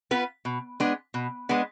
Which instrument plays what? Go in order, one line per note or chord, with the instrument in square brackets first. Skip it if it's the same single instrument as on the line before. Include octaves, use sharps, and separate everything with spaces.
[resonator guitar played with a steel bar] B3 F4 B4
B2
G#3 B3 D4
B2
G#3 B3 D4